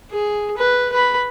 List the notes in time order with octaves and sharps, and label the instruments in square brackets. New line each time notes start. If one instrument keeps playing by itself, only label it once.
[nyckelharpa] G#4
B4
B4 B5